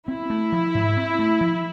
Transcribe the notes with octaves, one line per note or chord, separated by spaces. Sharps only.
C4 E4
A3
F3
G#2
C4
A3
F3